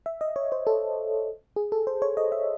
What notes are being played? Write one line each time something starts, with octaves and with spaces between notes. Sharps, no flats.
E5
D#5
C#5
C5
A4
G#4
A4
C5
C#5
D#5
E5